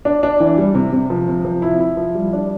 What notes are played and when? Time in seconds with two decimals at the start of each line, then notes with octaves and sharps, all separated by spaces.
0.05 D4
0.23 D4
0.40 E3
0.58 G3
0.75 C3
0.93 C3
1.10 F3
1.28 C3
1.45 F3
1.62 E4
1.80 E4
1.97 F3
2.14 G3
2.33 D4